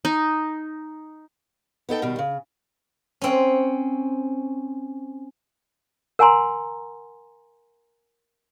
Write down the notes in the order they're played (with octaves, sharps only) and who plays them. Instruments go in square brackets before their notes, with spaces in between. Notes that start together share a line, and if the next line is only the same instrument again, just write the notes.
[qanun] D#4
[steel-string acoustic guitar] B3 D#4 A4 G5
B2 D#3 G3
C#3
[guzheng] C4 C#4
[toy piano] A#4 F#5 G#5 A#5 C6